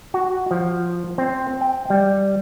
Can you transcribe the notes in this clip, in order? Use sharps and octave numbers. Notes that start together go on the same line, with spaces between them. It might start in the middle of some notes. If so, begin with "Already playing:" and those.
F#4
F3
C4
G5
G3